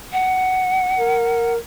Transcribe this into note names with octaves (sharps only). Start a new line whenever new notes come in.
F#5
A#4